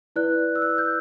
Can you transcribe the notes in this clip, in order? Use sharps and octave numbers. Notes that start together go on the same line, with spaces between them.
E4 B4 D5 F#6
E6
F#6
G6